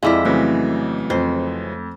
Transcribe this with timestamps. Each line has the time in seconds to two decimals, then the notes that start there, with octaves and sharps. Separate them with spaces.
0.03 F2 G#3 E4 D5 F5 D6 E6 B6
0.25 C#3 E3 F#3 A3 C4
1.10 F2 C5